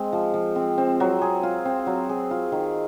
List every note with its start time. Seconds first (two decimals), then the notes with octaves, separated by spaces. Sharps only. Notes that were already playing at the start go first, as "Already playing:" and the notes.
Already playing: G#3 C4
0.13 F3
0.34 F3
0.55 C4
0.78 C4
1.00 F#3
1.22 G#4
1.43 F4
1.65 C4
1.87 F#3
2.09 G#4
2.31 F4
2.52 D#3